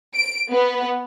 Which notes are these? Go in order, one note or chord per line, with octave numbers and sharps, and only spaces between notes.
D7
B3